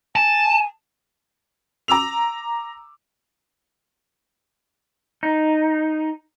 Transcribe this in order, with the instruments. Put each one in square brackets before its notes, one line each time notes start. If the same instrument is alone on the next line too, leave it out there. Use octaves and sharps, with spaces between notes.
[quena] G#5 [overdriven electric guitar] A5
[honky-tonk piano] A#5 D6 E6 F7
[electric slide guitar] D#4